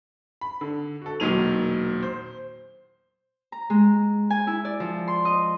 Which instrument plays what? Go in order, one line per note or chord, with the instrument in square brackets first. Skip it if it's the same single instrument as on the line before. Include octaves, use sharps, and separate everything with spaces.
[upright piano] B5
D3
F#4 A4
E1 A#2 D#3 F#3 D#7 F7
C5
[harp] A#5
G#3
G#5
E4
D5
F3
C6
D#5